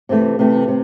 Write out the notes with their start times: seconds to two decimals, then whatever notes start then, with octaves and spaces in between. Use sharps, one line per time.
0.09 C3 E3 A3
0.39 C3 E3 A3
0.68 C3